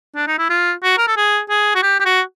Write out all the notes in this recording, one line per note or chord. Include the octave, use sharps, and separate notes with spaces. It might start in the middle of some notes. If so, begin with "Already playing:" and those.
D4
D#4
E4
F4
F#4
A#4
A4
G#4
G#4
F#4
G4
G4
F#4